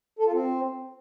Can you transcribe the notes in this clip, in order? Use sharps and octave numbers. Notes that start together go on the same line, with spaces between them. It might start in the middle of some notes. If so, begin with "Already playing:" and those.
A4
F4
C4